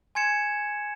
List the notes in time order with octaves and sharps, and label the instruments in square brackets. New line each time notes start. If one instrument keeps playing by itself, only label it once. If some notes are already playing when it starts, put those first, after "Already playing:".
[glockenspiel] G#5 C6 G#6 C#7 E7